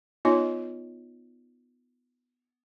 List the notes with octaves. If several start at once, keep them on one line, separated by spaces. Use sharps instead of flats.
B3 D#4 F4 C#5 D#5